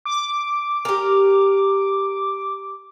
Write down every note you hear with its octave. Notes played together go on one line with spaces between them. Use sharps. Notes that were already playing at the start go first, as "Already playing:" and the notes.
D6
G4 A#4